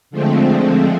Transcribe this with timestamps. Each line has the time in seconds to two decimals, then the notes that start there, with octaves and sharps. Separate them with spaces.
0.11 D3 F3 G#3 A3 C4